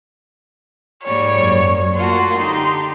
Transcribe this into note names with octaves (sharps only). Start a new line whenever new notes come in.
G#2 F3 G3 A#3 C#5
F#2 A#3
A3 A#3 F4 F#4 F#5 A5 C6
D3 D#4 G4 A5